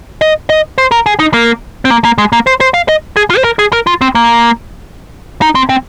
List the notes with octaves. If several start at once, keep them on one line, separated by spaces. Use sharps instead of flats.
D#5
D#5
C5
A#4
G#4
D#4
A#3
C4
A#3
A#3
G#3
A#3
C5
C5
F5
D#5
G#4
F4
C5
A#4
G#4
A#4
F4
C4
A#3
D#4
C4
C4